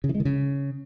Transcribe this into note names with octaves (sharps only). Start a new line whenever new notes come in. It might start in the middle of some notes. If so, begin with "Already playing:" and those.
C#3
E3
G#3
D#3
C#3